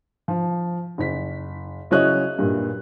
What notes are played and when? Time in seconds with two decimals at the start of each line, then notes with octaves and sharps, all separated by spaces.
0.28 F3
0.98 F#1 B6
1.91 C#3 F#3 E4 C#5 D#5 F#6
2.39 G2 A#2